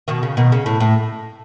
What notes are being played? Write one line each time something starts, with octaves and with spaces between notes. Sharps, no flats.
B2 D#3
C#3
B2 D#3
C#3
A2
A2